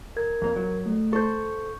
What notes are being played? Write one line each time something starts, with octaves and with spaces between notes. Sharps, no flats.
A#4 G#6
F2 A#3
F#3
A3
A4 C5 C#6 G6